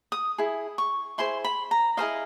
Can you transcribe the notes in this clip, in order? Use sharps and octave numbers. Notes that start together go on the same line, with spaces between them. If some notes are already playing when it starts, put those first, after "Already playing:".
D#6
E4 G#4
C#6
E4 G#4 C5 C6
B5
A#5
E4 G#4 C5 D#5 F5